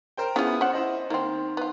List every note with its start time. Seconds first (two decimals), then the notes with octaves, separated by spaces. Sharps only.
0.17 A#4 C5 G5
0.36 B3 C#4 E4 F4 G#4
0.61 C#4 C5 F#5
0.73 E4 C5 D#5
1.10 D#3 A#3 C4
1.57 B3 F4